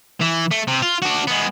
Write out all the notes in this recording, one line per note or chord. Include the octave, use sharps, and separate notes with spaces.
E3
A3
C3
F4
D4 F#4
G#3 B3